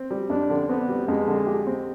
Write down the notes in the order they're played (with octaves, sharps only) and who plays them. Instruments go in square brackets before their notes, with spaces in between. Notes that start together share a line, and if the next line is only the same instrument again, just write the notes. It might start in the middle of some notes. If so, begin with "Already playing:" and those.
Already playing: [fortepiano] C4
G3
[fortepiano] F2 [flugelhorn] D4
[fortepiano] D3
[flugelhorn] B3 [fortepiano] C4
[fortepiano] G3
[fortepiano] F2 [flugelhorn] G#3
[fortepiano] D3
G4
C4